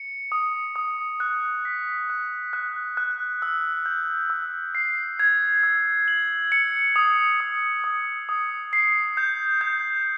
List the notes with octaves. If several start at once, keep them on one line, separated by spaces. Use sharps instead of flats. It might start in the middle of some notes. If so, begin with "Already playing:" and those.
Already playing: C#7
D#6
D#6
F#6
B6
F#6
F#6
F#6
E6
G6
E6
C7
G#6
E6
F#7
C#7
D#6
D#6
D#6
D#6
C7
G6
G6